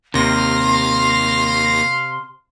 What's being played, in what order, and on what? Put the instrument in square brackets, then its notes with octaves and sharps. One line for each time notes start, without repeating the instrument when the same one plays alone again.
[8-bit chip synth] D#2 A#6 [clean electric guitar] C3 [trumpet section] F5 [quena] C6